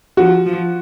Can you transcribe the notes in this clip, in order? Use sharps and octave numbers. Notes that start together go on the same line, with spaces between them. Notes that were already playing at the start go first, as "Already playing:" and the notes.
F3 F#4
F3